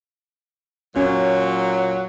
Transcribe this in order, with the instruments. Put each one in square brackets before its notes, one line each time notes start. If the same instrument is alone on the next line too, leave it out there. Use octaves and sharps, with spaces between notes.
[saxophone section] A#2 F#3 [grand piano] C#4